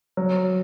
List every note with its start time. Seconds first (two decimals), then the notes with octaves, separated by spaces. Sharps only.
0.17 F#3